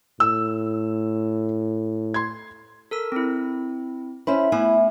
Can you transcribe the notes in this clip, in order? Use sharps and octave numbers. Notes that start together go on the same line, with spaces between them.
A2 E6
C6 G#6
A4 A#4 E6
C4 E4
C#4 E4 C5 B5
A3 B3 E4 G#5